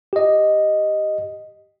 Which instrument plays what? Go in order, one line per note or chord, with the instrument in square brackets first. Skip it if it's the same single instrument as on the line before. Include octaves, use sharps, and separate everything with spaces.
[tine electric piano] G4 D#5